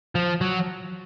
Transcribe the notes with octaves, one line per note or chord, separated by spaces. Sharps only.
F3
F#3